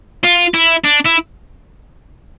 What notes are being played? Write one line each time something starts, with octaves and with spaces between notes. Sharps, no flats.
F4
E4
D4
E4